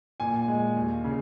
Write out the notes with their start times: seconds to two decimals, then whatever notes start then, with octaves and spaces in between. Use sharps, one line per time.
0.20 A#2 G#5
0.48 G#3
0.76 D#2
1.04 C#3